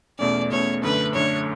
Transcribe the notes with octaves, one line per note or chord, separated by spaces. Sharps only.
E2 B2 A3 C#4 D5
E2 B2 A3 C#4 C#5
F#2 D3 A3 D4 B4
F#2 D3 A3 D4 C#5